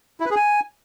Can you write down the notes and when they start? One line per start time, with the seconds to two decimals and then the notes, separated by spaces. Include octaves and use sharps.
0.20 E4
0.26 B4
0.31 G#4
0.36 G#5